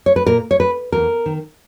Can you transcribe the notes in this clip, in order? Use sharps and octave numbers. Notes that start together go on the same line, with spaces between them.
C#5
B4
A#2 A#4
C#5
B4
E2 A#4
D#3